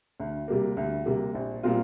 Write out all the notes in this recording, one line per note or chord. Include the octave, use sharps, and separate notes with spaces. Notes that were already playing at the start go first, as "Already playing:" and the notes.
D2
C3 G3 A#3
D2
C3 G3 A#3
A#1
A#2 G3 C4 F4